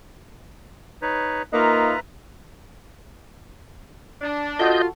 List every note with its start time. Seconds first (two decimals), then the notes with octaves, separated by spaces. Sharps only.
1.02 D#4 B4 C#5
1.53 A#3 D#4 F4 B4 E5 A#5
4.22 D4
4.59 F4 F#4 A4 D#5 G6